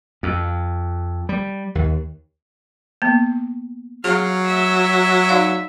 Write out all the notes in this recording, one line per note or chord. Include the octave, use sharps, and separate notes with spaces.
F2
G3
D#2
A#3 B3
F#3 G#4 F5
E5
D#4 D5 F5